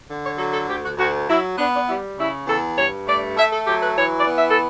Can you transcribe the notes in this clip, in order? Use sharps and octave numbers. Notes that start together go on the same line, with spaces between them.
D3
C#5
F#3 A4
A4
D2 G4
F#4
D2 F#4
F#3 E4
B3 D4
D4
G3 E4
C#3 E4
E2 A4
G2 C#5
A3 D5
A3 E5
A4
F#3 G4
B4
E3 C#5
D5
B3
E5
A4